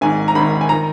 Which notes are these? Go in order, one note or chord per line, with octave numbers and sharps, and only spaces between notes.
G#1 G#2 D#3 G#5
A#5
G#1 G#2 D#3 B5
G#5
D#3 A#5